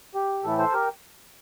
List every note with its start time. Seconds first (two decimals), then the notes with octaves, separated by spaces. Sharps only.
0.15 G4
0.43 A2 E3 A3 E4 A4
0.58 A4 C5
0.73 G4 A#4